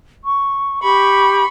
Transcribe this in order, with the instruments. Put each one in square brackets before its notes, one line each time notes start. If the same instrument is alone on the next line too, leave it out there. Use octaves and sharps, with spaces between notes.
[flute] C#6
[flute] G4 [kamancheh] B5 C#6